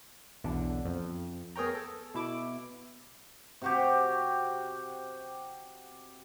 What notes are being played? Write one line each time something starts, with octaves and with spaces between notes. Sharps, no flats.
B1 E2 D3
F2
B3 G#4 A#4 C#5 G5 A#5
A4
B2 E4 D6
C3 F#4 G4